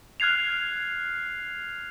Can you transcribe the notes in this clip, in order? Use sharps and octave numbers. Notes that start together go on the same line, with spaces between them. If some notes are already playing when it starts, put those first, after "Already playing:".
F6 F#6 G#6 C7 F7